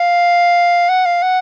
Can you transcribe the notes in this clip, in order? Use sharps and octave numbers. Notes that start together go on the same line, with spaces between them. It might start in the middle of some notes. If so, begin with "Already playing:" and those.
Already playing: F5
F#5
F5
F#5